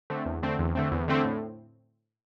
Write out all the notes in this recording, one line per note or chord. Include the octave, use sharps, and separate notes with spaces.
D3 A3 C4
E2
D3 A3 C4
E2
D3 A3 C4
E2
D3 A3 C4
A2